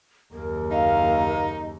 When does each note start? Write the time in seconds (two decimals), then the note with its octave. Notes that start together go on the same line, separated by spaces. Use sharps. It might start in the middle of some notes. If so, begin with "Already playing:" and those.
0.34 F#1 D#2 A#4
0.71 D#4 F5